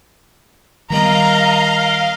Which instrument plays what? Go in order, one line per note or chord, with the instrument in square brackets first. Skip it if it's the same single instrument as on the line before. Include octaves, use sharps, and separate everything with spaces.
[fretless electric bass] D#3 G3 B3 [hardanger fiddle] A#4 D#5 [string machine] F5 [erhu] A#5